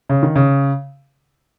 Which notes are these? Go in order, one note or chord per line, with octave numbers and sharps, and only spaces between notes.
C#3
D#3
C#3